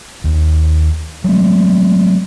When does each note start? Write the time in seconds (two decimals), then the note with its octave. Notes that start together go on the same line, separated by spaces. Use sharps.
0.24 D#2
1.24 F#3 G#3 A3 C4